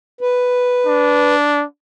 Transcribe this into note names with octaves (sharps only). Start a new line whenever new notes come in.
B4
D4